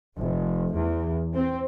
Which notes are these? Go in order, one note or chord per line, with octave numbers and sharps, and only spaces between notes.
F1
E2
C4